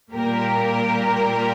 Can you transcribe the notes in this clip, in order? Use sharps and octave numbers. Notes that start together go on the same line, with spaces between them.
A#2 G3 A#3 G4 A#4